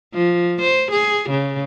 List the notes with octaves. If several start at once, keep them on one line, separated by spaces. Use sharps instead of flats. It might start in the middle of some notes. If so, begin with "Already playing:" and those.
F3
C5
G#4
C#3